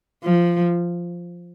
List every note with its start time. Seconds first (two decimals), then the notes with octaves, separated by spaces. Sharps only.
0.24 F3